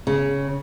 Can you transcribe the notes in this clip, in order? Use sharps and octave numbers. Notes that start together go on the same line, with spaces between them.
C#3